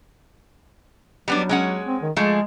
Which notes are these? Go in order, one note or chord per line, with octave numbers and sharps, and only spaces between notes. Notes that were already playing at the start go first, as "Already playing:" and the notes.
F#3 G3 B3 D4
G#3 C#4 F#5
C4
D#3
F3 G#3 A3 G#4